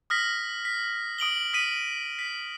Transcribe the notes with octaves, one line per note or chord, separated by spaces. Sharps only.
D#6 F6 A#6 B6
B6
D#6 D7 F#7 G7
D#6 B6 D#7
B6